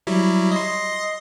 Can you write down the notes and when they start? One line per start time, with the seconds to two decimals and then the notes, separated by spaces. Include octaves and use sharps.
0.07 F#3 G3 E4
0.52 D#5 C6